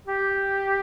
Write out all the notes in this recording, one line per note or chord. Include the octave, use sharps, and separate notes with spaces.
G4